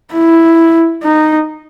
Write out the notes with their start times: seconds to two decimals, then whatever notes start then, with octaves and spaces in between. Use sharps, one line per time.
0.14 E4
1.03 D#4